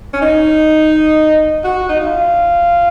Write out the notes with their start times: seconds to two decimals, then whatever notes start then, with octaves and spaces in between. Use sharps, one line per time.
0.13 C#4
0.21 D#4
1.64 F#4
1.89 D#4
2.00 F4